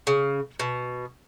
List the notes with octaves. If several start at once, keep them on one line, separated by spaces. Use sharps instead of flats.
C#3
B2